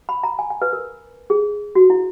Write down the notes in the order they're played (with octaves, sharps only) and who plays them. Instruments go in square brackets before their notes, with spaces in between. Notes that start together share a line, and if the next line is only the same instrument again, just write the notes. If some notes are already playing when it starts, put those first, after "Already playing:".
[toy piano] B5
A#5
G#5
G#5
B4
A#4
G#4
F#4
E4